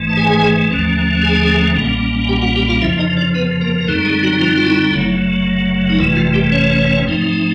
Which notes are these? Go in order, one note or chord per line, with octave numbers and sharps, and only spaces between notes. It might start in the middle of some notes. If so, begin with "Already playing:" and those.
Already playing: G#1 G#2 E3 A3
A5
G#4 G#5
D#2 D3 F3 A3 C#4
G#4 G#5
B1 A#2 G3 A#3 C#4
G4 G5
F#4 F#5
G4 G5
F4 F5
F2 C#3 F3 E4 E5
D#4 D#5
D4 D5
B3 B4
A#3 A#4
A#4
F#2 D3 G3 A3 C4 D#4 A4
G#3 G#4
F#3 F#4
F3 F4
F4
E4
F#1 F#2 C#3 F#3 A3
D#4
G1 F2 C3 E3 A3 E4
F3 F4
G3 G4
C#4 C#5
G#2 F3 A3 C4 D#4